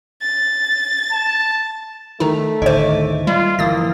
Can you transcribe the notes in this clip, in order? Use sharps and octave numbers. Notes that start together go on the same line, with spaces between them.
A6
A5
D#3 A3 D#4
G1 D2 A2 D#3 C5 D#5 E5
G3 F4
G1 E3 F3 A#3 D#6 A6